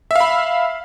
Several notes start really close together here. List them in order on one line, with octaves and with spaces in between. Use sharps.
E5 F5 B5